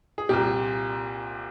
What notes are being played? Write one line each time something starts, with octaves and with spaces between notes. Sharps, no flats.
G#4
C2 A#2 G4